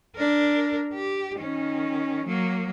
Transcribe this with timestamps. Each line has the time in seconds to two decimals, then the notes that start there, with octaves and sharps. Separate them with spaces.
0.16 D4 A#4
0.93 G4
1.36 D#3 C#4
2.26 F#3 A#3